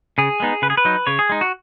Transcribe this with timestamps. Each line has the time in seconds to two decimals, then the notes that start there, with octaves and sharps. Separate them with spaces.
0.18 C#3 G#4
0.40 G#3 B3 D#4
0.62 C#3 B4
0.70 G#4
0.77 B4
0.85 F#3 D#4
1.07 C#3 C#5
1.19 G#4
1.29 G#3 D#4
1.41 F#4